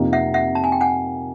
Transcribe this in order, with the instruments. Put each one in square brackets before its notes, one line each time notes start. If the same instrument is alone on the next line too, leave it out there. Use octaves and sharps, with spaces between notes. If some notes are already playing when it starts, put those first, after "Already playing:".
Already playing: [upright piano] F2 C3 F3 A#3 D#4
[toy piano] E5 F#5
E5 F#5
A5
G#5
G5
F#5 G#5